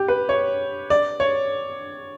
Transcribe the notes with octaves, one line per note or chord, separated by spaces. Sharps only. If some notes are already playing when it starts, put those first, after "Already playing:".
Already playing: G4
B4
C#5
D5
C#5